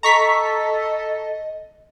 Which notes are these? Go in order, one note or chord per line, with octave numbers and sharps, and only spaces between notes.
A4 D#5 A#5 C#6 B6